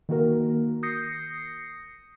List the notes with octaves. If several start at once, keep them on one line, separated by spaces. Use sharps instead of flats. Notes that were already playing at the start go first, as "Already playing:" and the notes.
D#3 A#3 F#4 A#4
D#6 G6 A#6 C7 C#7